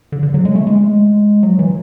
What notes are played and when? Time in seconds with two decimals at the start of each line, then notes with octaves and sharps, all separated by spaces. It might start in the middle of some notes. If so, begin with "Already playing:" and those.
0.12 D3
0.23 D3
0.34 F#3
0.45 G#3
0.55 A3
0.67 G#3
1.43 F#3
1.59 E3